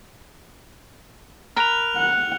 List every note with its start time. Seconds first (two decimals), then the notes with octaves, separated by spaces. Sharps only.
1.56 A#4 B5 F6 F#6 F7
1.97 F#5